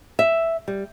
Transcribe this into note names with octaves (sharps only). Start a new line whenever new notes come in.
E5
G3